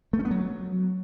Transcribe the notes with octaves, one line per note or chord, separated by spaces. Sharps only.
A3
C#4
B3
F#3